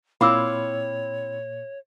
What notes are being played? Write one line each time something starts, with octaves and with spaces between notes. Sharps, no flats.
A#2 C4 E4 C#5 F5 B5 D6 E6